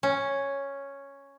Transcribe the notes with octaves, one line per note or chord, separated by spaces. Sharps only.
C#4